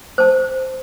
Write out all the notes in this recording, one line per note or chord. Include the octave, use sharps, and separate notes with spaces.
C5 A5